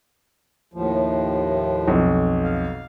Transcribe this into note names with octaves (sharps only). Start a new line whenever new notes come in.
D#2 A2 F3
B1 F2
F5